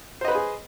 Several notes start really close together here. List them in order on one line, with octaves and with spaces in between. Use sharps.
C5 D#5 B4 B5 G#4